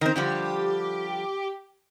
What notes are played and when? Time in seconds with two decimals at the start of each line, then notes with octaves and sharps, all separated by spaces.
0.01 D#3 C4 A#4
0.16 D3 F3 G3 G4